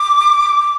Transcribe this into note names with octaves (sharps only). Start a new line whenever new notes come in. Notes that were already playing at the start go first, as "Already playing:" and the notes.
Already playing: D6